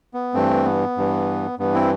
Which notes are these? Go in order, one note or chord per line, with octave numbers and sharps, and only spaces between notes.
B3
G2 E3 A3 C4
B3
G2 E3
G2 E3 B3
C4 E4